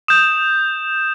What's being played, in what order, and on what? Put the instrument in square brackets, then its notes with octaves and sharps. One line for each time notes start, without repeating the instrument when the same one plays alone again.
[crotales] D#6 G6 E7